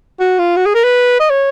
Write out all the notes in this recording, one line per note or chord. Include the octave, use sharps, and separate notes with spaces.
F#4
F4
F#4
G#4
A#4
B4
D#5
C#5